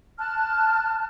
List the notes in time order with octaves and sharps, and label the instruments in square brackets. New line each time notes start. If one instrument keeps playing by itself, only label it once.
[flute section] A5 F6 F#6